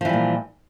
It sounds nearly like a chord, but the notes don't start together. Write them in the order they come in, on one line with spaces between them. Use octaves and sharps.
F3 E3 G3 A#2